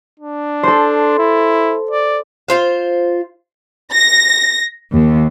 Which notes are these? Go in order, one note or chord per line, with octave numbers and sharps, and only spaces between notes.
D4
A4 C5
E4
D5
F4 C5 F5
A#6
D#2